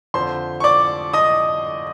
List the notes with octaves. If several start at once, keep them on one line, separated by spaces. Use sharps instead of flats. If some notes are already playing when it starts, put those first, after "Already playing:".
F2 D3 C5 C6
C#6
D5 D6
D#5 D#6